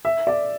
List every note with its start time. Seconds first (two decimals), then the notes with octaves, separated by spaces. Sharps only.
0.05 E5
0.27 D5